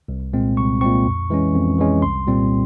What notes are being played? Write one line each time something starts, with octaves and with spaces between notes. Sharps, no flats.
C2
A#2 G#3 C4
C2 C#6
A#2 G#3 C4 C#6
F2
E3 G#3 C#4
F2
E3 G#3 C#4
C2 C6
A#2 G3 C4